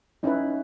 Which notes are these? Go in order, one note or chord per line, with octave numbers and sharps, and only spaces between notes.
C#4 D#4 E4 B4